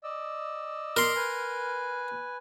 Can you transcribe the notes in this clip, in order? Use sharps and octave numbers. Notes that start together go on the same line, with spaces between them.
D5 D#5 E6
A#4 C6
B4 G#5